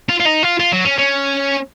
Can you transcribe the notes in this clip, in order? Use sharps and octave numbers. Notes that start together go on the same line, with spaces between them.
F4
F4
D#4
F4
F4
F#3
C#4
C#4